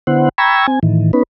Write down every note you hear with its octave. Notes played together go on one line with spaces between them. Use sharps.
D3 B3 E4 C5 F#5
G5 A#5 B5 C#6 E6 G#6
C4 G#5
A2 D#3 E3
B3 C#4 D#4 B4